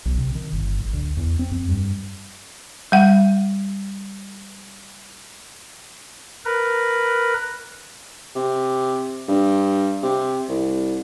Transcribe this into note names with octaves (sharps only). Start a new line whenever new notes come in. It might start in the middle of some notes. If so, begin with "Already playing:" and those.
B1
C3
D#3
G1
A1
D2
E2
C4
F2
G2
G3 F#5
A#4 B4
C3
G2
C3
C2